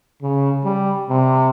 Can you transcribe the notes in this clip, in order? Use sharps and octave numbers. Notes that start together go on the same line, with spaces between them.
C#3
G3
C3